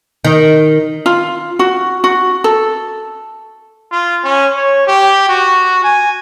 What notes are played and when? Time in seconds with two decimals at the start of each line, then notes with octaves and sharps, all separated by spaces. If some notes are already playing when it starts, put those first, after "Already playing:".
0.25 D#3
1.06 F4
1.59 F#4
2.04 F#4
2.44 A4
3.91 F4
4.24 C#4
4.56 C#5
4.87 G4
5.29 F#4
5.84 G#5